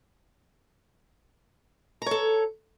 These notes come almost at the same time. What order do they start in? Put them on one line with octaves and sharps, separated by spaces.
A#5 C#5 A4